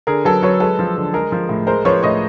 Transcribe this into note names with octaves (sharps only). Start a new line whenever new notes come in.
D3 G#4 A#4
F#3 A4 B4
F#3 B4 C#5
G#3 A4 B4
F3
D3
G#3 G#4 A#4
F3
A2
G#3 A#4 C5
F3 B4 C#5
A2 C#5 D#5